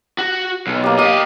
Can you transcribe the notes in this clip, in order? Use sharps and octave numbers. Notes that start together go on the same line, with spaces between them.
F#4
B1
A#3 G4
G4 D#5 F5